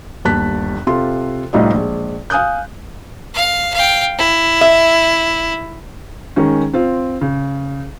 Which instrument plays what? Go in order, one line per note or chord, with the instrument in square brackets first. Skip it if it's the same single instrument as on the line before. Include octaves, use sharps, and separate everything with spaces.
[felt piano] G1 D#2 A5 F#6 B6
C3 F4 A4 C6
C2 A2 D#4 F4 G4 D#5
A#1 G#3
F5 G#5 D#6 F#6 G6
[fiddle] F5
F5 G5
E4
[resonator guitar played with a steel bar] E5
[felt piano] D#3 G#3 C#4
C4 F4
C#3